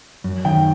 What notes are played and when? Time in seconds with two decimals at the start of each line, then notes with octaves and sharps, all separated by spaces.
0.24 F#2
0.45 D#3 G5